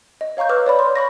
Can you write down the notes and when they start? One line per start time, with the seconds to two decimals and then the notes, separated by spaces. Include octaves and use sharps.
0.21 D#5
0.37 C#5 F5 A#5 C#6 G6
0.49 B4 D6 E6 F6
0.66 C#5 D5 B5
0.79 C6
0.96 B5 C#6 A#6